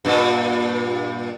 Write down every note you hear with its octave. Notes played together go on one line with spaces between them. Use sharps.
G2 A#2